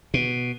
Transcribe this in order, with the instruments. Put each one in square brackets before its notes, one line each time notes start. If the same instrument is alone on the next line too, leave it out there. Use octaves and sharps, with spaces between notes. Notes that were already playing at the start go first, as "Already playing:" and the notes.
[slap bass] B2